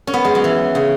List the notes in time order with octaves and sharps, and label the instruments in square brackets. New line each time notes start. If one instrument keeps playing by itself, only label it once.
[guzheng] C#4
B3
G#3
F#3
E3
C#3